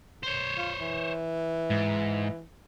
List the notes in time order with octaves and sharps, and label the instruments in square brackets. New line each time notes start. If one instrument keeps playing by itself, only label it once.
[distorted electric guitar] C5 C#5
[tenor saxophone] F4
E3
[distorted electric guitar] G#2